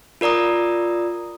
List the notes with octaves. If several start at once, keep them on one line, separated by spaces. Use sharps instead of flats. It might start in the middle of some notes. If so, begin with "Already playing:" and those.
F4 A#4 D5 A#5 D#6